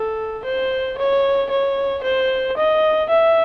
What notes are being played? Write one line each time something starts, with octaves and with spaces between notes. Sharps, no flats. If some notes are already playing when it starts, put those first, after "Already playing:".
Already playing: A4
C5
C#5
C#5
C5
D#5
E5